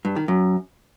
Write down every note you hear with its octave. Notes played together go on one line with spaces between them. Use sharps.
G2
D#3
F#2